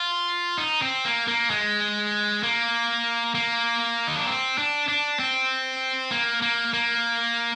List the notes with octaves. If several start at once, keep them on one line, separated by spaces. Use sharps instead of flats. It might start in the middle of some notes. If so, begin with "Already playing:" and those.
Already playing: F4
D#4
C4
A#3
A#3
G#3
A#3
A#3
D#4
D4
C4
D4
D4
C4
A#3
A#3
A#3